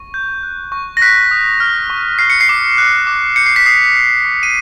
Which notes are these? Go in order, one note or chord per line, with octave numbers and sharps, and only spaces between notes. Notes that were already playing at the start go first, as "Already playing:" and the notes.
Already playing: C#6
G6
F#6
C#6
A#6
F#6 B6
D#6
F6
C#6
F6 C7
C#7
C7
D6
F#6
D6
G6 C#7
C7
B6
D#6 C7
F6
C#6
D#7